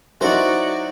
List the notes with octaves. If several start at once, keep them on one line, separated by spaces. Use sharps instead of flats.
F#3 D#4 E4 F#4 C5 D5